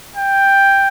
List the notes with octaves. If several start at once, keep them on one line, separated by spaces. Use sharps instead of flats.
G5